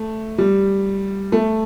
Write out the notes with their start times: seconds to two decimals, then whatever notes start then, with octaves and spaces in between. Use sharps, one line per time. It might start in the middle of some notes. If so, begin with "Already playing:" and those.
Already playing: A3
0.38 G3
1.32 A3